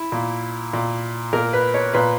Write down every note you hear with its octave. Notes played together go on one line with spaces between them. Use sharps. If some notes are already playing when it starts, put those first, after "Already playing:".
Already playing: E4
A#2
A#2
A#2 A#4
B4
C#5
A#2 B4